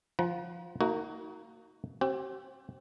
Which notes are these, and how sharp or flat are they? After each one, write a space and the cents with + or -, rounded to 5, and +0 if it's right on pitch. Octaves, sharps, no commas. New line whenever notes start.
F3 +0 F#5 +20 A#5 +45
A#3 -25 D#4 +35 F#4 +15
C4 +25 G4 -40